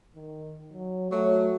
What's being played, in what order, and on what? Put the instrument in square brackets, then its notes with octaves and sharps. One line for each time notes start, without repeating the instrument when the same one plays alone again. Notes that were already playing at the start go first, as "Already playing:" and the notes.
[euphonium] D#3
F#3
[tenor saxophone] F#3 [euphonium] A3